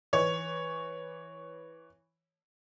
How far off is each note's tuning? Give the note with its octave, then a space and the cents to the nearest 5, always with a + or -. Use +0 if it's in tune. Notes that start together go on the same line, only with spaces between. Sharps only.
E3 +0 C#5 +0